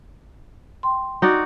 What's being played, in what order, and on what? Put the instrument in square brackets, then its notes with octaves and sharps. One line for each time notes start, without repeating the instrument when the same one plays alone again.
[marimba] G5 C6
[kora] D#4 F#4 D5